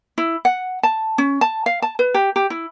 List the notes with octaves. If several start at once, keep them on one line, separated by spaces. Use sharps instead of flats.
E4
F#5
A5
C#4
A5
F5
A5
B4
G4
G4
E4